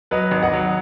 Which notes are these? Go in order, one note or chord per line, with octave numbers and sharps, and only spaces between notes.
F#3 B4 D#5
G#1
D#5 F#5
F#3